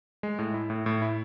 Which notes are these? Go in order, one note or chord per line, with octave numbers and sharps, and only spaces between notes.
G#3
A2
E4
A2
A2
E4